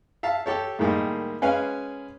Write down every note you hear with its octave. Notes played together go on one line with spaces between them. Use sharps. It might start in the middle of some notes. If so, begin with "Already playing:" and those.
E5 F5 A5
G4 A4 C#5
A2 D#3 G3 G#3 A#3
G#3 C#4 B4 F5 G#5